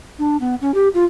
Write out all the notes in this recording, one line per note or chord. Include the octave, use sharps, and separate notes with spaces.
D4
B3
C#4
G4
F4